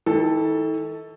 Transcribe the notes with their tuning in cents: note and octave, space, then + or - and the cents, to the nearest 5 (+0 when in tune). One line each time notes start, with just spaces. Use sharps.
D#3 +45 A4 +0